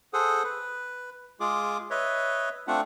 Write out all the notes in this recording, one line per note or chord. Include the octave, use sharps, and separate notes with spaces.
G#4 A4 C5 F#5 D#6
B4
G#3 F4 G#4 D6
B4 C#5 D#5 E5
A3 C4 D4 F4 F#5